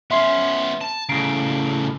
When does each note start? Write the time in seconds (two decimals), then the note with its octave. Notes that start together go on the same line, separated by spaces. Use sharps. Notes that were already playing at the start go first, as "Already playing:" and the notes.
0.11 B3 C#4 E5 C6 C7
0.81 A5
1.09 A2 C#3 A#5 C7 D7